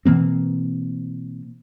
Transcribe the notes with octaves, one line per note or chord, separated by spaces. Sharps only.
B2 E3 A#3 C4